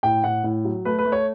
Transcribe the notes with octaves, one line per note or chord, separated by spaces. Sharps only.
A2 G5
A2 F#5
A2
F#3
A3 B4
B4
A3
C#5